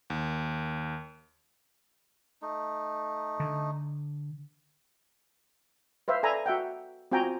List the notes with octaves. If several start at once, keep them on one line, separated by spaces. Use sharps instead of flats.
D#2
A3 D#4
D3
B4 C5 E5 F5
A4 D5 E5 G#5 A#5 B5
F#4 E5 F#5 G5
C4 F4 F#4 G5 G#5 A#5